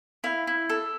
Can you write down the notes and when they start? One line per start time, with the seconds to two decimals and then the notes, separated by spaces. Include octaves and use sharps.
0.24 E4 F5
0.47 E4
0.69 A4